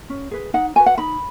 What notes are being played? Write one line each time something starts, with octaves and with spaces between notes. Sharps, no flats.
C#4
G#4 B4
D#4 F#5
F#4 B4 G#5
F#5
D#4 B5